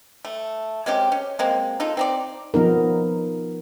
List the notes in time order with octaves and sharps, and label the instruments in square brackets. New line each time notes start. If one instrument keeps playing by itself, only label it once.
[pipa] A3
G#3 C4 C#4 G4
C#4
G#3 A#3 C4
D#4 F4 A4
C4 D#4 D5
[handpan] F3 B3 D#4 A#4